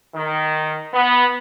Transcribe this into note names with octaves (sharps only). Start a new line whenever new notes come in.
D#3
B3